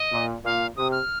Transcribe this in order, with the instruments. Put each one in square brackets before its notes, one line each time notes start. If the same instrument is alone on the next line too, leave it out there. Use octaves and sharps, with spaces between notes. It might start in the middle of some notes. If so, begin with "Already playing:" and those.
Already playing: [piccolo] D#5
[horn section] A#2
[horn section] A#2 [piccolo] F5
[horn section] C3 [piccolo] D#6
[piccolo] F6